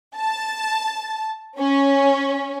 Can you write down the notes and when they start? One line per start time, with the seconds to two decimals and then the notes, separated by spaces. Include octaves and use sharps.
0.17 A5
1.59 C#4